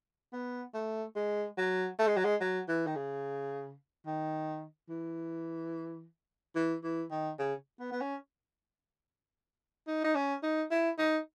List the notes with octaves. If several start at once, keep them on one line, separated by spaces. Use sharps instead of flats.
B3
A3
G#3
F#3
A3
G#3
F#3
G#3
F#3
E3
D#3
C#3
D#3
E3
E3
E3
D#3
C#3
B3
B3
C#4
D#4
D#4
C#4
D#4
E4
D#4